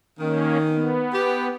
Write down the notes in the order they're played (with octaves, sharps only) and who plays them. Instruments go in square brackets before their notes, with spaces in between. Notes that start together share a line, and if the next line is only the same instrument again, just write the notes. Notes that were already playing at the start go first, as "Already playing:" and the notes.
[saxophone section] D#3 [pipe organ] A#3 C#4
[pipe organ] B3
[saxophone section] G4